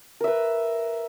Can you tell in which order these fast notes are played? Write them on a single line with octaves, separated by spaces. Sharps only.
A#4 E5 B4